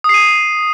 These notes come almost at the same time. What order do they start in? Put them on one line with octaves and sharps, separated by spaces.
D#6 C7 D#7